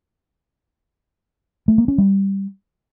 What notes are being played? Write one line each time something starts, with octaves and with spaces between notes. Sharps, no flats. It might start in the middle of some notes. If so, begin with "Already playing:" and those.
A3
A#3
C#4
G3